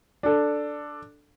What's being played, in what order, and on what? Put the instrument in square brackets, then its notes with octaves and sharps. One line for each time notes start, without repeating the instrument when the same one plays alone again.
[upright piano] D4 A4